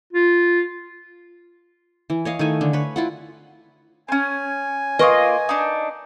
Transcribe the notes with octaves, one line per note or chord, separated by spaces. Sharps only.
F4
E3
C#5 D#5 F5
D#3 A3 G#5
D3
B4 C#5
E4 F4 F#5
C4 C#4 G#5
A#3 F4 B4 D#5 C#6 D#6
D4 D#4